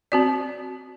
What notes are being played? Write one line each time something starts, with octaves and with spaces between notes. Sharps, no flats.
C4 F#4 D5